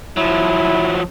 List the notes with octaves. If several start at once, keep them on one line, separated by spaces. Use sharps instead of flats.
F3 F#3 E4